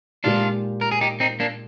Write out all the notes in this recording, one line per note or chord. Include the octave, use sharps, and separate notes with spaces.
A#2 G#3 D4 D#4 F4 G4
A#4
G#4
D#4 G4
C4 D#4
A#3 D4